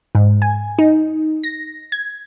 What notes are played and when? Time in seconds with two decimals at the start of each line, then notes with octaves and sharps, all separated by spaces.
0.15 G#2
0.42 G#5
0.79 D#4
1.44 A#6
1.92 G#6